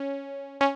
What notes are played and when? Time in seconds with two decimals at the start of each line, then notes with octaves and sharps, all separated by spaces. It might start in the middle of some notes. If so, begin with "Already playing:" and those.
Already playing: C#4
0.61 C#4